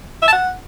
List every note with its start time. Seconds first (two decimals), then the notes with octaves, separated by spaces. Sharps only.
0.23 E5
0.28 A5
0.33 F#5